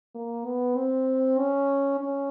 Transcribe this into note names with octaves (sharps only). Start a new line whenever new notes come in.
A#3
B3
C4
C#4
C#4